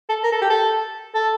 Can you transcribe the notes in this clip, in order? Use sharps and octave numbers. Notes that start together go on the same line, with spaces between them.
A4
A#4
A4
G4
A4
A4